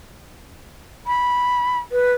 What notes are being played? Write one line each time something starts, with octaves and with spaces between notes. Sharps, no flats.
B5
B4